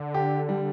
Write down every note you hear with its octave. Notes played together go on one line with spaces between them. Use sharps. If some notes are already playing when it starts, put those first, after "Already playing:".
Already playing: D3
G4
G3